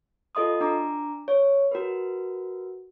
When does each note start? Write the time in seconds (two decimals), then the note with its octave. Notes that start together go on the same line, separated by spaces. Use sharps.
0.35 F4 A4 D#5 C6 D#6
0.61 D4 A#5 D6
1.28 C#5
1.71 F#4 A#4 B4